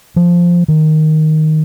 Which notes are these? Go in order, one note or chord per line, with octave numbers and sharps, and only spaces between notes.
F3
D#3